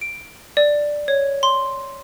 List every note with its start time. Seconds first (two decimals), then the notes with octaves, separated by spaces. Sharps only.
0.01 D7
0.57 D5
1.08 C#5
1.43 C6